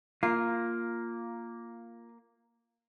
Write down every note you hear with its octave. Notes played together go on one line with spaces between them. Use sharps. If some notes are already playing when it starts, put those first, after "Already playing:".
A#3 F4